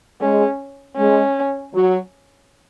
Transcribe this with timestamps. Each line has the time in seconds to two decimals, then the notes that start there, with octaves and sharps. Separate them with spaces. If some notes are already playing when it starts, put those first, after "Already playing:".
0.21 G#3 C#4
0.97 G#3 C#4
1.74 F#3